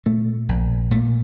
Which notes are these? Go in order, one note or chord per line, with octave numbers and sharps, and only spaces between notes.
A#2 A3
A#1
A#2 A3